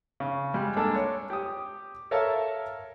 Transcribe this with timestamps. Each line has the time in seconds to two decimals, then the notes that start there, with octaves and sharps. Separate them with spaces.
0.20 C#3
0.54 G3 G#3 G4
0.76 G#3 A#3 D4 A4
0.95 C#5
1.30 G4 D#6
2.11 A4 A#4 C#5 E5 F5 A5